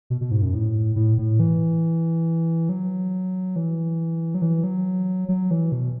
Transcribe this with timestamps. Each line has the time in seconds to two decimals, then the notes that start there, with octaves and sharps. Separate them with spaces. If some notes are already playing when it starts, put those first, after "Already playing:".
0.10 B2
0.21 B2
0.31 G#2
0.42 F#2
0.54 A2
0.96 A2
1.18 A2
1.40 E3
2.69 F#3
3.56 E3
4.34 F#3
4.42 E3
4.64 F#3
5.28 F#3
5.51 E3
5.72 B2